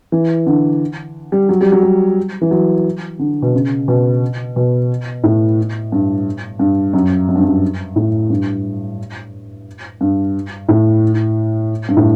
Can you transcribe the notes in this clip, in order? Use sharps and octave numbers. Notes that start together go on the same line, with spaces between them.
E3
D3
G3
F#3
G3
F#3
G3
E3
F#3
D3
B2
C#3
B2
B2
A2
G2
G2
F#2
F#2
G2
F#2
A2
G2
G2
A2
G2
A2